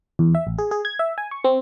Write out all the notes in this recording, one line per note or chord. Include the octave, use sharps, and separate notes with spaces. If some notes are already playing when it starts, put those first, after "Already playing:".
E2
E5
A1
G#4
G#4
G#6
E5
G#5
C#6
C4